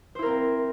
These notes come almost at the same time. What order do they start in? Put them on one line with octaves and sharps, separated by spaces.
C5 E4 A#4 C4